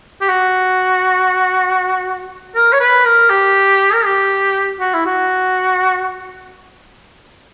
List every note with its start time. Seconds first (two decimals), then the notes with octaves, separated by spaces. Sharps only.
0.21 G4
0.29 F#4
2.55 A#4
2.73 C#5
2.80 B4
3.05 A#4
3.29 G4
3.93 A#4
4.05 G4
4.80 F#4
4.94 E4
5.06 F#4